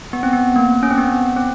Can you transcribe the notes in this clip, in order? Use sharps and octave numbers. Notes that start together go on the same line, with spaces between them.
B3
C4
B3
A#3
C#4
C4
B3
C4